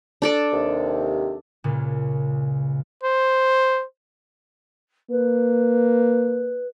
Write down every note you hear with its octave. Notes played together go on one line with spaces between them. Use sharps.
D4 A4 D5
D#2 C3
C#2 A#2 C#3
C5
A#3 B4